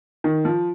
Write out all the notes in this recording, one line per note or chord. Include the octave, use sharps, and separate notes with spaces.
D#3
F3